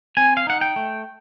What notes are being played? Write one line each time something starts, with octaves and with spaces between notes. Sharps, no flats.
C4 G#5
F5
D#4 F#5
G5
A3